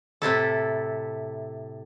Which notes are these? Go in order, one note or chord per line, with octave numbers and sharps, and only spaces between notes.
A2 C3 E4 A4